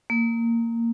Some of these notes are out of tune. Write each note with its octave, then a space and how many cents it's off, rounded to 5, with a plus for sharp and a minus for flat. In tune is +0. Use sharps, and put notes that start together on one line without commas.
A#3 -15